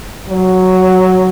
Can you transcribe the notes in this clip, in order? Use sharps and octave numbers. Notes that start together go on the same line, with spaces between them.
F#3